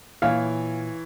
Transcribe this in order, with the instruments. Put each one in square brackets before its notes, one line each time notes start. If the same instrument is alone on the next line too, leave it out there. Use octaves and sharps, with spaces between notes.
[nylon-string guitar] A#2 [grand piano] E3 C#5 [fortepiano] F5